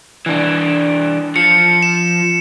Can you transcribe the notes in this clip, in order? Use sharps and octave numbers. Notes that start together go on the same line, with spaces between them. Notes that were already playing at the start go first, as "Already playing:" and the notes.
E3 D4
F3 C#7
E7